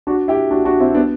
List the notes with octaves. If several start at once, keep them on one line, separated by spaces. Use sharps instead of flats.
D4 F#4
E4 G4
D4 F#4
D4 F#4
C4 E4
B3 D4